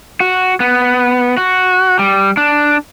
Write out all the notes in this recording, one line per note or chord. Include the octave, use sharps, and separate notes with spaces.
F#4
B3
F#4
G3
D4